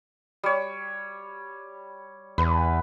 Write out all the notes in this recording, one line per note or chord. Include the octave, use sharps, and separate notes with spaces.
G3 C#5
E2 B4